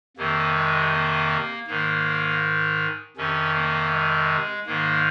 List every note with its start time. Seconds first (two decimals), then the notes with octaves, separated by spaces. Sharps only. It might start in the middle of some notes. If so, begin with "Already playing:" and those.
0.17 F2 C3 D#3 A#3
0.55 G#3
0.92 A#3
1.67 G#2 D#3 A#3
3.17 F2 C3 D#3 C#4
3.54 A#3
3.92 G#3
4.66 G#2 D#3 A#3